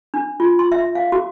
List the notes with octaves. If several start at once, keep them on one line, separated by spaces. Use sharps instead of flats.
D4
F4
C6
E5
F5
F#4